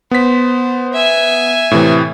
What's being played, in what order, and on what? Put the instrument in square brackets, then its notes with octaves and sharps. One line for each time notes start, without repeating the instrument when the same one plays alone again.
[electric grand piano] B3 B6 [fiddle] C5
[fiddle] E5 G#5
[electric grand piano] A2 C3 E3